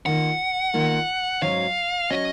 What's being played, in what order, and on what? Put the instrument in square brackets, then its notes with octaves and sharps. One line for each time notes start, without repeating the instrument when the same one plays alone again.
[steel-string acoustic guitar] D#3 A#3 F4 [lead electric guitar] F#5
[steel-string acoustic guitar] D#3 A#3 F4
[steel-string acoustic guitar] G#2 F#3 C#4 F#4 C#5 [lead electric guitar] F5
[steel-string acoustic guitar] F#3 C#4 F#4 C#5 [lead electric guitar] D#5